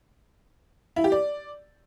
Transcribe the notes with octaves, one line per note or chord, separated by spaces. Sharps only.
E4
G4
D5